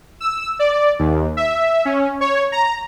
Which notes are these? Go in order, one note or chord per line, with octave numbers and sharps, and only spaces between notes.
E6
D5
D#2
E5
C#4
C#5
A#5